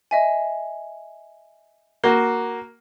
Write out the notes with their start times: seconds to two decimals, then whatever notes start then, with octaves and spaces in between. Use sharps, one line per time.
0.11 D#5 E5 G#5
2.04 A#3 F#4 G7